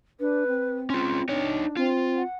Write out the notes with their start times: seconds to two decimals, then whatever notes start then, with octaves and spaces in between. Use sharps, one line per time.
0.20 D4 B4
0.48 C4
0.90 C#4 F4 C6
1.29 D4 D#4 C#5
1.77 C4 F4
2.17 F#5